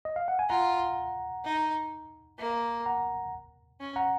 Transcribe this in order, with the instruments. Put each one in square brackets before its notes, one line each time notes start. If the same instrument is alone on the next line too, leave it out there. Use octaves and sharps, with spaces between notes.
[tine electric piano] D#5
F5
F#5
G#5
[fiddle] F4 [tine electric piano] F#5 A#5
[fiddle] D#4
A#3
[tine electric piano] F#5 A#5
[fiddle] C#4
[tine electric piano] F#5 A#5